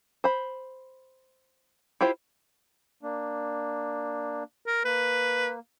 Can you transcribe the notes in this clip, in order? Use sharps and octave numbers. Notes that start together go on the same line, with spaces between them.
C5 B5
E4 F4 G4 C5
A#3 D4
A#4
A#3 B4